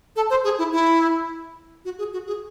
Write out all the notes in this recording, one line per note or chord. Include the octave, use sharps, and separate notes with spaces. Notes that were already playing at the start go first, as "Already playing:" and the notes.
A4
C5
G#4
E4
E4
F#4
G#4
F#4
G#4